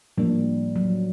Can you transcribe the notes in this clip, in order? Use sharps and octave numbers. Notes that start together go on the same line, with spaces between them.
A2 F3 G3 A#3 D4
F#3